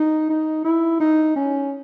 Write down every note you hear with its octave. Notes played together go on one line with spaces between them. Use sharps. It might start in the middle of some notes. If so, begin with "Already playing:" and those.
Already playing: D#4
D#4
E4
D#4
C#4